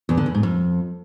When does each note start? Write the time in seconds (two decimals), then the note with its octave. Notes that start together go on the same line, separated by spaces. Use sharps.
0.09 E2
0.17 D3
0.26 E2
0.35 G#2
0.43 F2